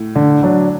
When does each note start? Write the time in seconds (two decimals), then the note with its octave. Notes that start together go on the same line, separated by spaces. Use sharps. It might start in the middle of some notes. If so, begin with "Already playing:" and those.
Already playing: A2
0.15 D3
0.43 F#3 D4